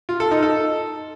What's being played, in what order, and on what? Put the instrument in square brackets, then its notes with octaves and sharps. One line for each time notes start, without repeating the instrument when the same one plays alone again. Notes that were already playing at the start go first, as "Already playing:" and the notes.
[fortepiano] F4
A4
D#4
A4